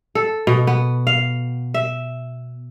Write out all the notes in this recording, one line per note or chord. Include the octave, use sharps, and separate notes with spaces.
A4
B2
B3
F5
E5